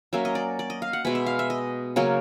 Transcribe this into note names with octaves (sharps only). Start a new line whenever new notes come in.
F#3 A#3 C#4 E5
D#5
D5
D5
D#5
F5
F#5
B2 G#3 B3 E5
E5
F5
E5
D#5
C#3 F#3 A#3 C#4